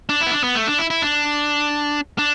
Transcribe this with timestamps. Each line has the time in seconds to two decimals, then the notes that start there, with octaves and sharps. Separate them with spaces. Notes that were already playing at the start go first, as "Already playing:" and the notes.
0.09 D4
0.21 E4
0.26 B3
0.32 D4
0.44 B3
0.55 A3
0.67 D4
0.79 E4
0.90 E4
1.02 D4
2.18 D4